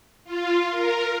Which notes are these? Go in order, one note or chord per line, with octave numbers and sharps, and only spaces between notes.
F4
A#4